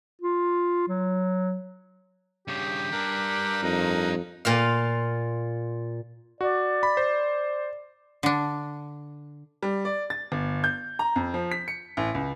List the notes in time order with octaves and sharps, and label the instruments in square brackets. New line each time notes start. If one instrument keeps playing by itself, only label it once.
[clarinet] F4
F#3
[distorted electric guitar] G2 C#3 [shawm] G4
[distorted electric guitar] G2 D4 [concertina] A#4 F#6
[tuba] F2 [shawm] D#4
[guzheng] A#2 F4 F5
[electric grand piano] F#4 [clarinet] D5
[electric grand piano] B5
C5
[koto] D3 D4
[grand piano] G3
D5
A6
G1
G6
A#5
F2
F3
B6
C#7
A1
C#2